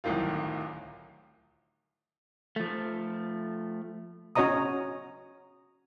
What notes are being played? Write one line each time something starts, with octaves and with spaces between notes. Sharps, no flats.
D1 C2 A2 D#3 F#3 F4
F3 A3
C#4 F#4 C#5 D#5 A#5 D#6